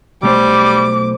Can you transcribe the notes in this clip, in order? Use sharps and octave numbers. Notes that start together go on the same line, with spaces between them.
B1 G3 A3 C5 D6